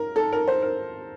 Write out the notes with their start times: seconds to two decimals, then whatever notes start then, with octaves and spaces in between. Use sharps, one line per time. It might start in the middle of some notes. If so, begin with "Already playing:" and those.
Already playing: A#4
0.16 A4
0.33 A#4
0.48 C5
0.62 A#4